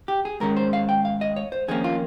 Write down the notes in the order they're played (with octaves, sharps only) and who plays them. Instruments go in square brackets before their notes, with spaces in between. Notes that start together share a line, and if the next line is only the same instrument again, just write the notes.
[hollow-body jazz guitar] G4
G#4
G#2 D#3 G#3 C#4 A#4
C5
F5
G5
F5
D#5
C#5
C5
F2 D#3 A#3 C#4 G#4
F4